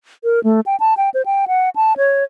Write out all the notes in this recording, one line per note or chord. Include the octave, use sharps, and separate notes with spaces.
A#4
A3
G5
A5
G5
C5
G5
F#5
A5
C#5